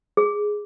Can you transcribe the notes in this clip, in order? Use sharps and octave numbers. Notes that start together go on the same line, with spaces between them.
G#4